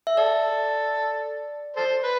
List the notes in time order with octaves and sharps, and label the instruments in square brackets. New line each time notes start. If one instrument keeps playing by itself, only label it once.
[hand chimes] E5
[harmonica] A4 [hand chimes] D5
[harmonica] A4 C5
B4